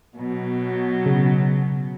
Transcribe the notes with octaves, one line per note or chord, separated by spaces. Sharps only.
B2 F#3
C#3